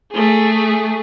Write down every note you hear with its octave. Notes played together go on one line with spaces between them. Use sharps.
A3 G#4